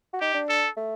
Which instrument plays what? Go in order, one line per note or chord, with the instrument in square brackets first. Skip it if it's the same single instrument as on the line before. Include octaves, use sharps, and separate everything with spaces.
[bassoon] F#4
[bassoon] D#4 [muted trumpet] G4
[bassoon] D4
[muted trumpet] A4
[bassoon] A3